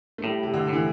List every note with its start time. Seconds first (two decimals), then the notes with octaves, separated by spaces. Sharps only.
0.18 A3
0.24 A2 G3
0.43 C3
0.54 D3
0.69 A2 E3